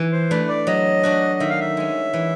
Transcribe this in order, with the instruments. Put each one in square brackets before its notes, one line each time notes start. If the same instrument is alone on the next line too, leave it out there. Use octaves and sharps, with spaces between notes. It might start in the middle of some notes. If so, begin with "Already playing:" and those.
Already playing: [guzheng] E3
[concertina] C5
[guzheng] A3 D4 [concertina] B4
[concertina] D5
[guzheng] F#3 [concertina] D#5
[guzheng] A3 D4 F#4
[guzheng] D#3 [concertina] E5
[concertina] F5
E5
[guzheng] G#3 C#4
E3